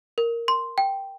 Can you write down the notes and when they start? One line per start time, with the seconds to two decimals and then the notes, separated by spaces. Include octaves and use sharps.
0.18 A#4
0.48 C6
0.78 G5